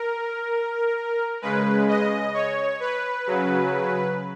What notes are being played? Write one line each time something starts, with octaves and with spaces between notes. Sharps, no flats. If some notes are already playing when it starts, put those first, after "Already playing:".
Already playing: A#4
C#3 G#3 B4
D#5
C#5
B4
C#3 F#3